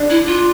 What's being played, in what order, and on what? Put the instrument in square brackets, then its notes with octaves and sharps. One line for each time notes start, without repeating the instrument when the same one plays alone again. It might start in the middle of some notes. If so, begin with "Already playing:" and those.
Already playing: [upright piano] D4
[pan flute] E4
F4